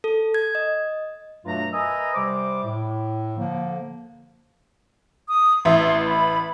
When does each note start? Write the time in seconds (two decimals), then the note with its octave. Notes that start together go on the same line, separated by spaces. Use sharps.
0.04 A4
0.34 G#6
0.55 D#5
1.45 G2 B2 F#3 A3 F4 A#5
1.72 A#4 B4 D#5 E5 G#5 A#5
2.14 C3 G3 C5 D6
2.64 A2
3.37 D3 F3 A#3
5.28 D#6
5.65 A1 E5 C6
6.06 B5